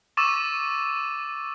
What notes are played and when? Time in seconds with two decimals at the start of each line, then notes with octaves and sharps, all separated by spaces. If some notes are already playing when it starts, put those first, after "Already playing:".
0.17 C#6 D6 E6 A6 D#7 E7